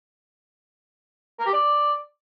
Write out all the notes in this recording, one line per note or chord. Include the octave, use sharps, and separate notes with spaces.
A#4
G4
D5